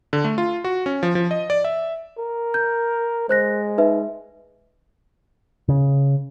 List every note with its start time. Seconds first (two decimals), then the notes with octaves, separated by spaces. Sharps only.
0.13 D3
0.24 A3
0.38 F4
0.64 F#4
0.86 C#4
1.03 F3
1.15 F3
1.31 D#5
1.50 D5
1.64 E5
2.19 A#4
2.54 G6
3.29 G#3 C5 F#6 A#6
3.78 D#4 B4 E5
5.68 C#3